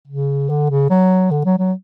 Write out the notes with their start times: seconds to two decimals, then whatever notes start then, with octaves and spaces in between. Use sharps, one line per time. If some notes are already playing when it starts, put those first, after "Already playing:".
0.08 C#3
0.50 D3
0.70 C#3
0.90 F#3
1.31 D3
1.45 F#3
1.59 F#3